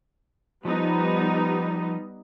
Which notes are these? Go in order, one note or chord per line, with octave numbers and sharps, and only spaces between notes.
F3 G3 B3 D#4